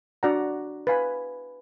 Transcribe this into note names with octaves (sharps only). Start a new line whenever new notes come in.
D4 F#4 D5 F#5 A#5
B4 F5 G#5 B5